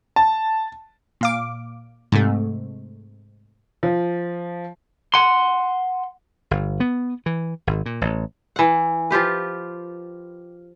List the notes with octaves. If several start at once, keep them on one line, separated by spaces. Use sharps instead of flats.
A5
A#2 F5 D6
G#2 C3 A3
F3
F#5 C6
G1
B3
E3
G#1
A#2
A1
E3 F#5
F3 F4 G4 B4